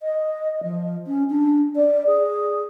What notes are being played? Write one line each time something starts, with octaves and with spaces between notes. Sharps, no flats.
D#5
F3
C#4
D4
D5
G#4